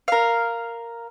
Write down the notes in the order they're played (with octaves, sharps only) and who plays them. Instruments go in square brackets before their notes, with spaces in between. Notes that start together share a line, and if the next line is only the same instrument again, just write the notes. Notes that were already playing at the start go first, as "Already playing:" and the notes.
[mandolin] A#4 F5